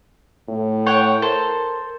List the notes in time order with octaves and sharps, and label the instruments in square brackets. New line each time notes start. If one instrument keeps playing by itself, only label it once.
[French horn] A2
[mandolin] C#5 F#5 G5
[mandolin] A4 C5 [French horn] A#4